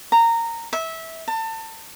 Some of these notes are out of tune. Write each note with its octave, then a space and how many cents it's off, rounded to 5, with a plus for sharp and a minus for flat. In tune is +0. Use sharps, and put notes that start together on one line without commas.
A#5 -15
E5 -20
A5 +30